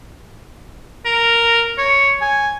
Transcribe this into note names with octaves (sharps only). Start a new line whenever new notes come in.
A#4
C#5
G#5